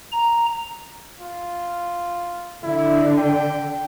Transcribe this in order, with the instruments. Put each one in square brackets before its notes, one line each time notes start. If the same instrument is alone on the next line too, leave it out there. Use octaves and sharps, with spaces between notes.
[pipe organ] A#5
[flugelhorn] F4
[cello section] D3 [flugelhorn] E4
[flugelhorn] G5